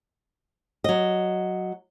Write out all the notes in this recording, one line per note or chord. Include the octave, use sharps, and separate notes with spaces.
F#3 D#5